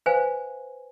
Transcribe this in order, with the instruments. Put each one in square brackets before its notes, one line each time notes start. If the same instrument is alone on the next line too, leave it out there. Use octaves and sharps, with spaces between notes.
[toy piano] B4 C5 F5 G#5